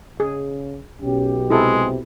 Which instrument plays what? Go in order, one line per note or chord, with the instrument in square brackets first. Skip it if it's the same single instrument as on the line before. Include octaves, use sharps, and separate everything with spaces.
[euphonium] C#3 [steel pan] G#4
[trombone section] B1 B2 G4 [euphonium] C#4
[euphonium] C3 [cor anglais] G#3 [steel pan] E4 A4